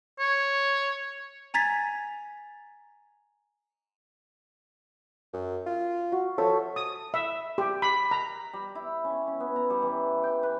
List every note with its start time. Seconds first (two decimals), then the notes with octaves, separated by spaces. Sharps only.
0.19 C#5
1.54 G#5 A#5 G#6 A6 B6
5.33 F#2
5.67 F4
6.12 F#4
6.38 F3 A4 C#5 E5
6.76 D#6
7.14 E5
7.58 G4
7.82 B5
8.11 A#5
8.53 G3
8.75 E4
9.04 C#4
9.27 C#4
9.40 B3
9.56 A#5
9.70 G3
9.82 E3
10.24 G5
10.43 B4